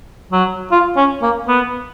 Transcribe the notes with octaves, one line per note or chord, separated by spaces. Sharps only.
F#3
F4
C#4
A#3
B3